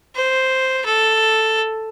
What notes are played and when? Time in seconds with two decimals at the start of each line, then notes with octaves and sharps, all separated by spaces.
0.15 C5
0.85 A4